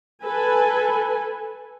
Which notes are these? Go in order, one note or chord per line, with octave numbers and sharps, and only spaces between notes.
A4 B4 G#5